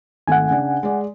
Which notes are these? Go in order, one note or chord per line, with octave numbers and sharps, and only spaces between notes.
G#1 A3 F#5 G#5
C#3 D4
G#3 D5